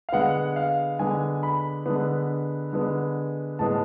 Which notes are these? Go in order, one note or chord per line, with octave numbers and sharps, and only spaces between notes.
F5
D3 G#3 B3 F#5
F5
D3 G#3 B3 G#5
B5
D3 G#3 B3
D3 G#3 B3
A2 G#3 B3 A5